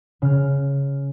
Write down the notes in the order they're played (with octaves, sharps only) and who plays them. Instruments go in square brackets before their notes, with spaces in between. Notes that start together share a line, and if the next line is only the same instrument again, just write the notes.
[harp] C#3 F6